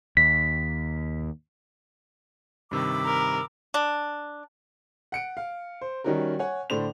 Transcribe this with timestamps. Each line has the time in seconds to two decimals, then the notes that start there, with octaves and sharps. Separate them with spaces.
0.17 D#2 B6
2.71 G2 C3 D#3 B5 D6 E6
3.06 A#4
3.74 D4
5.12 F#5 C#7 D7
5.37 F5
5.81 C5
6.04 D#3 G3 C#4 D#4 F#4 A#4
6.39 C#5 F#5 G#5
6.70 A2 D3 D4 C5 F7